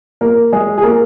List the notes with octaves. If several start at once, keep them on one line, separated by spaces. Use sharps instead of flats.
A#3 A#4
G#3 G#4
G#4
A#3 A#4